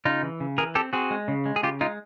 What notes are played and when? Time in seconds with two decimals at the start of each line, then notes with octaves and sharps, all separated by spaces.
0.05 C#3 D#4 F4
0.23 E3
0.40 C#3
0.58 E3 G#4 A#4
0.75 C4 G4 A4
0.93 C4 F#4 G#4
1.11 G#3
1.28 C#3
1.46 G#3
1.56 G#4
1.63 C#3 F4 G4
1.81 G#3 D#4 F4